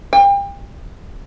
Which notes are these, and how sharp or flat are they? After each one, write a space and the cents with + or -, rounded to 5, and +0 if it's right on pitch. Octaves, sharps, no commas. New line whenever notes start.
G5 +35